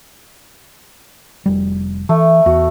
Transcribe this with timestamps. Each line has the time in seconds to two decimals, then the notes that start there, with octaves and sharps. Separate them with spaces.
1.46 F1 G3
2.09 E3 A3
2.46 E2 F#4